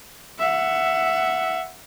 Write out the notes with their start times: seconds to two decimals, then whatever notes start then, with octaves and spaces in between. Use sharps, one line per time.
0.39 E5 F#5